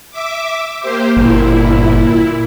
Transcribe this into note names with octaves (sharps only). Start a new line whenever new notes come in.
E5 D6
A#3 G4 C5
G1 A#2 E4